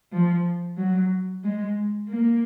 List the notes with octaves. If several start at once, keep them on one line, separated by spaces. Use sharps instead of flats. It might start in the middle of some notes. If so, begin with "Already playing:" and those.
F3
F#3
G#3
A#3